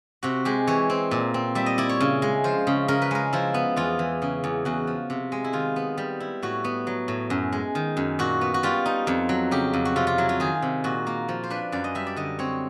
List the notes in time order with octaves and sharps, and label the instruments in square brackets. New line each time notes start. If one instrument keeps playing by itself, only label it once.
[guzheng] C3 F#4
G#3 G4
E3 C#5
C4
A#2
C4
G3 E5
D#5
E4 D5
C#5
C#3
G#3
F3 C5
C#3
C#3 A#4
B4
G#3 A#4
F3 E4
B3
E2 F4
E3
C#3
E2
E2 F#4
F3
C3
G#3
E4
D#3 F4
B3
G3
E4
A2 F#4
B3
F#3
A2
F#2
G#3
D#3
F#2
A#2 F#4
B3
F#4
G3 F4
D#4
F2
F#3
C#3 G4
F2
F#4
C3 F4
F4
F#3 E4
F4
D#3 G#4
C3
A#2 F#4
A#3
F3
C5
D4 B4
F#2 D5
D#5
G3 E5
D5
D3 D#5
C4 C#5